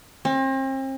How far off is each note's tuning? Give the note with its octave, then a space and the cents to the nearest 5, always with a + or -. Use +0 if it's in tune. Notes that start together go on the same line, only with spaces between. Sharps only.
C4 +40